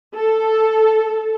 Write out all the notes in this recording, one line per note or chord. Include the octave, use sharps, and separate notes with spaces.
A4